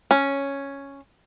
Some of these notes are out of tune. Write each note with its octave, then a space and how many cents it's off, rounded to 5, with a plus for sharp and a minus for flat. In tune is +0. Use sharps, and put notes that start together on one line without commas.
C#4 +0